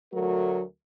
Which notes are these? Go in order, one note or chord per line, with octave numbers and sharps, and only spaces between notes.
D2 F#3 A3 F#4 A4 A#4